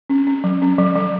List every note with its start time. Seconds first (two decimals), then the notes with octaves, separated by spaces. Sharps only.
0.10 C#4
0.27 C#4
0.44 F#3
0.62 C#4
0.78 F#3
0.96 F#3